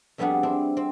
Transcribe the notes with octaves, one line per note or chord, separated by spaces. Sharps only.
F2 G3 B3 D4 G#4 F#5
C4 D4 E4
C4